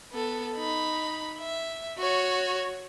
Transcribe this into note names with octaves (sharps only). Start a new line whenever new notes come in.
B3 A4
D#4 B5
E5
F#4 C#5